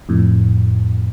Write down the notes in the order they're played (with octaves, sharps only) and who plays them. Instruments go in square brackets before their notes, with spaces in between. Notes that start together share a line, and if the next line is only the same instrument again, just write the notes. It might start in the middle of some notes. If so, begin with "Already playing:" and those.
[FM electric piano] F2 A2